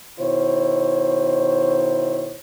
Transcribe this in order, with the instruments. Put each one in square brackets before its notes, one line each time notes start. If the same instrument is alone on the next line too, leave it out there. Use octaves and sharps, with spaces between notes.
[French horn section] B2 D#3 E4 C5 C#5